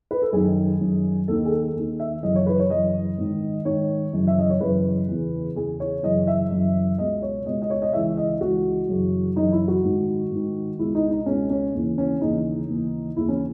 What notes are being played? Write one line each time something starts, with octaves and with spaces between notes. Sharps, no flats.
B4
A4
F#2 D#3 G#4
F#2 D#3
D#2 D#3 A4
G#4
A4
D#2 D#3
E5
F#2 C#3 E3 D#5
C#5
B4
C#5
F#2 C#3 E3 D#5
G#2 D#3
G#2 D#3 C#5
F#2 C#3 E3
E5
D#5
C#5
F#2 C#3 E3 B4
E2 C#3 E3
E2 C#3 E3 G#4
C#5
F#2 C#3 E3 D#5
E5
F#2 C#3 E3
C#2 B2 D#5
C#5
C#2 B2 D#5
D#5
C#5
D#5
C#2 C#3 E3 E5
D#5
C#2 C#3 E3 F#4
F#2 C#3 E3
F#2 C#3 E3 D#4
E4
F#4
G#2 D#3
G#2 D#3
C#2 B2 E4
D#4
D#4
C#2 B2 C#4
C#4
D#2 C#3 E3
C#4
D#2 C#3 E3 D#4
D#2 C#3 E3
D#2 C#3 E3 E4
C#4